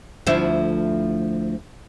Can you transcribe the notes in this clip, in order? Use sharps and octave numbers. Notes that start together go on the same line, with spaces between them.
D2 F3 E4